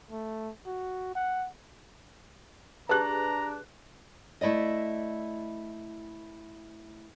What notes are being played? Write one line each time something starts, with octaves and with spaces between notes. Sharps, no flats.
A3
F#4
F#5
D4 G4 G#4 B4 A5 A#5 F#6
A3 E4 D5 D#5